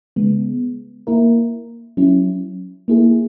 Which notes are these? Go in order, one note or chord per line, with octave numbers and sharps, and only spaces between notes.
C#3 G#3 B3
A#3 E4 A#4
F#3 C#4 E4
A#3 E4 G#4